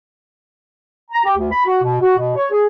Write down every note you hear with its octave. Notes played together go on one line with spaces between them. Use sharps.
A#5
G4
D2
B5
F#4
B2
F#4
B2
C#5
G#4